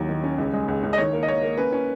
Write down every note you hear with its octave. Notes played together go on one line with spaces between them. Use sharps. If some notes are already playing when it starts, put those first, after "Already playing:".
Already playing: D#2 F#3
D#3
C#4
C#2
G#3
C#2
C#2
D#5
D#3 C#5
A#3
D#5
A#3 C#5
A#3
C#4 B4
C#4